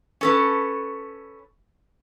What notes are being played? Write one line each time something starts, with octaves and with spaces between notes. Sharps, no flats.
C#4 A4 B4